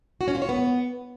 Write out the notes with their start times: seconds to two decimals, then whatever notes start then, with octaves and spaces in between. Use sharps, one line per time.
0.21 F#4
0.28 C#4
0.35 F4
0.42 C#5
0.49 B3